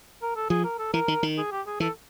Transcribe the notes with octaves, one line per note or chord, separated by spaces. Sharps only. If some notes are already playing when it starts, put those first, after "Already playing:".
A#4
A4
F3 G#4
A#4
A4
E3 A#4
D#3
D#3
G#4
G4
G#4
E3 A4